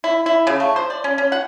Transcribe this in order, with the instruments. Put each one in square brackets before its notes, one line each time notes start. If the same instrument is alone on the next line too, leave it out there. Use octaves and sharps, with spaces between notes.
[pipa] E4
E4
C#3
A3
C5
D5
C#4
C#4
F#5